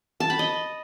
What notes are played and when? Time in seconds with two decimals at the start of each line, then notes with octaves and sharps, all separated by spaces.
0.20 A5
0.30 B5
0.39 D#5